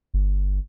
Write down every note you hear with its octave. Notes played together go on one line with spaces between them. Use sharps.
G1